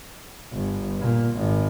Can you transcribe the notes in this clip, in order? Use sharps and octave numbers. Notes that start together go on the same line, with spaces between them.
G1
A#2
G#1